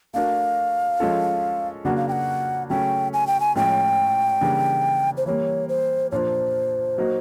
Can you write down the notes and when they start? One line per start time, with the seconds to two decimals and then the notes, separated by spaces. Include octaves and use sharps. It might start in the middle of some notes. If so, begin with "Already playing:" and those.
0.14 A3 D4 F#4 A#4 F5
1.00 F3 G#3 C#4 F4 A4
1.85 C#3 F#3 A#3 D4 F#4 F#5
1.96 F5
2.08 G5
2.12 F#5
2.70 C#3 F#3 A3 C#4 G5
3.13 G#5
3.27 G5
3.40 G#5
3.56 A2 F3 G#3 C#4 F4 G5
4.41 C#3 E3 G3 A#3 D4
5.17 C5
5.26 E3 G3 A#3 C#5
5.69 C5
6.12 A#2 F3 A#3 D4 F4 C5 C#5
6.98 F#3 A#3 D#4 F#4